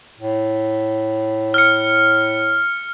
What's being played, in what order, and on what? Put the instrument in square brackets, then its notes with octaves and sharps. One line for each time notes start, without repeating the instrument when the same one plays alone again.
[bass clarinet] A2
[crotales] F6 C#7